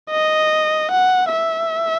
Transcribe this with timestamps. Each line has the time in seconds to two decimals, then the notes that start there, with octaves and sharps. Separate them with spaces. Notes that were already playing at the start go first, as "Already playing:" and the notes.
0.11 D#5
0.92 F#5
1.32 E5